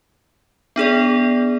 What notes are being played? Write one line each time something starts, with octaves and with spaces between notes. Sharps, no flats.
B3 D4 G#4 D5